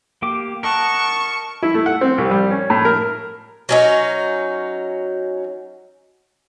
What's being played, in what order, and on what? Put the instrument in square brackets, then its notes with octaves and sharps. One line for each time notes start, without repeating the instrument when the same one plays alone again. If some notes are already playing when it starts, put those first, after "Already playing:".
[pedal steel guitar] A#3 G4 D6
[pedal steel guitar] A#4 D#5 F#5 [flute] A5 [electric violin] C#6
[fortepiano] E4
A3
F#5
C4
C2
G3
C#4
A2
A#4
[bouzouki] F#3 C#4 D#4